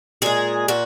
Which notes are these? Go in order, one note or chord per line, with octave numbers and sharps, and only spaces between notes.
A#2 G#3 G#4
A#2 F#4